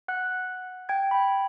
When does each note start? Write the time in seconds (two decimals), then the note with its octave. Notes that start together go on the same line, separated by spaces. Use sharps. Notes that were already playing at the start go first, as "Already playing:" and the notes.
0.08 F#5 F#6
0.89 G5 G#6
1.11 G5 B5